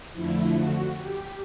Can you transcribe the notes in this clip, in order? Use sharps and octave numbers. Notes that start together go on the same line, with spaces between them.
F2 D3 F3 A3 E4
F#4
G4